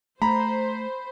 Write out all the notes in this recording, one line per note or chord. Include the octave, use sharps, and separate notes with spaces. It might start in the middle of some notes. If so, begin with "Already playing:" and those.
A3 C5 A#5 B5